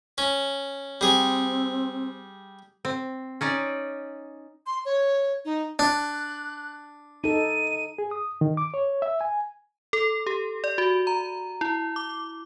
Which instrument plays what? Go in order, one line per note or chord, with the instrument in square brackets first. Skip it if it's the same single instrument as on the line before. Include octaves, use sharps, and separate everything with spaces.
[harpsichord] C#4
[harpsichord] G3 G#4 [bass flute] C4
[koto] C4
C#4 D#4 D5
[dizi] C6
C#5
D#4
[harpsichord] D4 [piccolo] F#6
[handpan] D#4 A4 [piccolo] D#7
[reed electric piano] G#4
D#6
D#3
D6
C#5
E5
G#5
[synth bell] A4
G4
D5
F#4
A#5
E4
D6